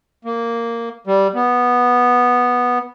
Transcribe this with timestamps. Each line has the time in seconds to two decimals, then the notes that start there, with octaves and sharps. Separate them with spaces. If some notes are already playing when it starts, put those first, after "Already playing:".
0.25 A#3
1.07 G3
1.35 B3